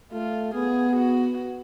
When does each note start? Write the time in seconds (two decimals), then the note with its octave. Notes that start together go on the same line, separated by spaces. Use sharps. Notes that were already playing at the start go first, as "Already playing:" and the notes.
0.13 A3 F4
0.54 B3 G#4
0.96 F#4